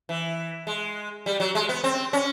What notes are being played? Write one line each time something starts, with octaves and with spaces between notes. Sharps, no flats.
E3
G#3
G3
F#3
G#3
B3
C4
C#4